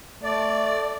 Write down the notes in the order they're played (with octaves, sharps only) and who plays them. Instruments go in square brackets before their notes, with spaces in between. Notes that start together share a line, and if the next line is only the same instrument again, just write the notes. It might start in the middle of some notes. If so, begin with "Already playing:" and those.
[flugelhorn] A3 [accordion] D5